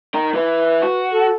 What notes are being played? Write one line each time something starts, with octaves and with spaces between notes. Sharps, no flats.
D#4 A#4
E3 E4 B4
F#4
A4